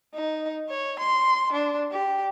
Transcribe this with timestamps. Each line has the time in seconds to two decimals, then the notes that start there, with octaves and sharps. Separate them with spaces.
0.14 D#4
0.69 C#5
1.00 C6
1.52 D4
1.92 G4